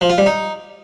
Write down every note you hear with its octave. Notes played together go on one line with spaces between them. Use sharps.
F3
F4
G3
D#4